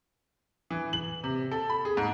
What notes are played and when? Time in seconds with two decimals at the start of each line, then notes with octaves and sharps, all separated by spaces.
0.70 E3
0.93 F#7
1.24 C3
1.51 A4
1.69 B5
1.85 G#4
1.97 G#2